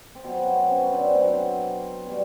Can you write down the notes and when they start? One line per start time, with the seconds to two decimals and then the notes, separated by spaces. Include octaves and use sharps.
0.15 C4
0.24 B2 F#3 B3
0.47 C4
0.69 B3 C#4
0.92 C4 D4
1.15 B2 F#3 C4
2.06 B2 G3